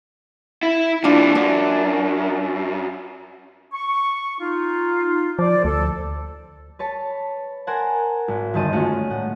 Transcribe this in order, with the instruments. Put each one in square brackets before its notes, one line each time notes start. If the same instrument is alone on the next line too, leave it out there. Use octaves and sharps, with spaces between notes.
[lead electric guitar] E4
[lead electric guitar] A#2 E3 [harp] D4 F4
[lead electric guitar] F#2 [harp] D4
[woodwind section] C#6
D#4 F4
[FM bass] F3 [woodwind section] C5 D5
[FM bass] D2 [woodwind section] A4
[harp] B4 C#5 A5
A#4 C5 F#5 G#5 A5
G#1
G1 D2 D#3 C5 A5 D#7
G#3 A3 C#4 F4 F#4
A2 F#5